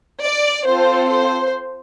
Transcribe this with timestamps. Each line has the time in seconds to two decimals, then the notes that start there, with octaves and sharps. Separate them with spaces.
0.21 D5
0.65 C4 F4 A4 C5
1.09 C5